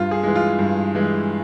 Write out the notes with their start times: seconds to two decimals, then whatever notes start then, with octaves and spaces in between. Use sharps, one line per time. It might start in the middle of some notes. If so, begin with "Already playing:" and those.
Already playing: G2 F4
0.11 G#4
0.23 E3 G#3
0.36 F4
0.59 G2
0.95 E3 G#3